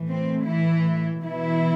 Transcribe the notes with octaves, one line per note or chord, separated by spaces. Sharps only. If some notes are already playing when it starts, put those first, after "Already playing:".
Already playing: A2 E3 A3
C4
E3 E4
B2 E3 B3 E4